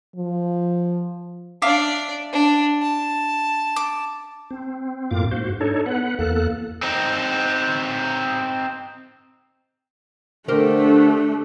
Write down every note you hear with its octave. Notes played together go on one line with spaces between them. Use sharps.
F3
D4 D5 E5 F5 D6
D4
A5
D6
C4
F#2 A2 A#3 F4 D6
G#2 F#4 C5
D4 D#4 A4 C#5
B3 B4 F#5
E2 A#3 A4 F#6
C4 D#4
D3 A3 D4 G4 A#4 C5